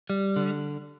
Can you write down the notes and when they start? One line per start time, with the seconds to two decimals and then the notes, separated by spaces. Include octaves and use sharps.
0.10 G3
0.36 D3